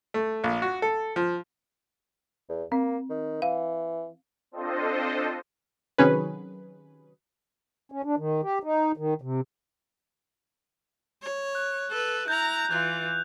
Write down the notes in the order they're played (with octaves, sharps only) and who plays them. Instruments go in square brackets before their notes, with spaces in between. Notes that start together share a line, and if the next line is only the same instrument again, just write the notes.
[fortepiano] A3
A#1
F#4
A4
F3
[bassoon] E2
[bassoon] A#3 [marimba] C4
[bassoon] D#3
[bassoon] E3 [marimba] F5
[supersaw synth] C4 D4 F4 A4 C5 D#5
[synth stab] C3 D#3 F#3 C#4 G#4 B4
[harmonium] C#4
D4
D#3
G4
D#4
D#3
C3
[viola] C#5
[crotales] F#6
[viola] A4 B4
[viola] E4 A#5 [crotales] G6 F7
[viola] E3 F4 [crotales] F#6